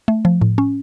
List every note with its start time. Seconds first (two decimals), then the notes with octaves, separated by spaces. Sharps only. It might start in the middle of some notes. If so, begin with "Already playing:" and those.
0.08 A3
0.25 F3
0.41 A2
0.58 C#4